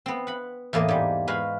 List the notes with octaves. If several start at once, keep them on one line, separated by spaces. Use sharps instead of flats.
B3 C4
F#5 B5
E2 A2 A#3 D5 D#5
G#2 G3
G#3 F#4 B4 F5